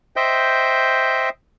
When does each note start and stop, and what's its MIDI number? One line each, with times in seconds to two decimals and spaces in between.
0.16 1.29 72
0.16 1.29 75
0.16 1.29 76
0.16 1.29 79
0.16 1.29 91